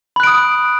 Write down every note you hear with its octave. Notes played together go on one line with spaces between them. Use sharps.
B5 D#6 F#6 D7